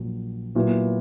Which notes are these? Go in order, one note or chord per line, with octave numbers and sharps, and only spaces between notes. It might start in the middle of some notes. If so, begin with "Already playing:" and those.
Already playing: A#1 A#2 F#3
A#2 F#3 B3 E4